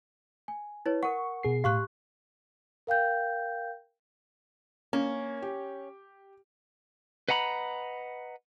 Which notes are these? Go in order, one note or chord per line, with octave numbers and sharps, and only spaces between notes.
G#5
E4 B4 C#5
A#4 F#5 C#6
B2 G#4 C7
A2 G4 F5 C#6 F#6
A#4 F5 G5 G6
A#3 C#4
G4
B4 D#5 F#5 A#5 B5